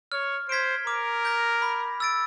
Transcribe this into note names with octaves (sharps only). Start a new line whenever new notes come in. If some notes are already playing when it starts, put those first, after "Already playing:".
C#5 F6
C5 G#6 B6 D7
A#4 D6
G6 A#6
B5
E6 A6 D7